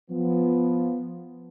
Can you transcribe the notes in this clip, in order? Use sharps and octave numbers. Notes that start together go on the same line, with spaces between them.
F3 B3